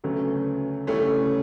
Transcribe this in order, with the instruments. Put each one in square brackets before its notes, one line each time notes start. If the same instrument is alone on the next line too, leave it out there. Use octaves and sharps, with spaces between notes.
[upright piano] D2 C#3 F#3 B3 [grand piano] A3 C#4
[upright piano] E1 D2 C#3 E3 G3 [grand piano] A3 C#4